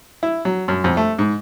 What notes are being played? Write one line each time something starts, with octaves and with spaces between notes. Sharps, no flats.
E4
F#3
F#2
F2
A3
G#2